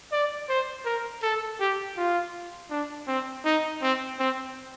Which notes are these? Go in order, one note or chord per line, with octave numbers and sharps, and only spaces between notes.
D5
C5
A#4
A4
G4
F4
D4
C4
D#4
C4
C4